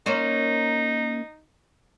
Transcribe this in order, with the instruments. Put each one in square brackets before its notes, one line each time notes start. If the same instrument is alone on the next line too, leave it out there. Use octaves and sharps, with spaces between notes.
[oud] A#3 C#4 C5 [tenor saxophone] D#4